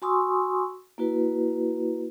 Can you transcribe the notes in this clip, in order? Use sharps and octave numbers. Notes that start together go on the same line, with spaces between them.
F#4 G#5 C6 C#6 D#6 E6
A#3 E4 F#4 B4